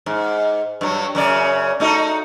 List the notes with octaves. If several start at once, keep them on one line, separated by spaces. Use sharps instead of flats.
G#2
G2 F#3
F#2 C#3 D5
A3 D#4 F#4